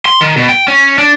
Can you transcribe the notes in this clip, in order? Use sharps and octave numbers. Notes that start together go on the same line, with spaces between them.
C6
D#3
B2
G5
C#4
D4